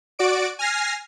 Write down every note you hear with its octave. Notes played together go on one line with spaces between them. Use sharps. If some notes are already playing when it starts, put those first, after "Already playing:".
F#4 D5 D7
G#5 F6 A#6 C7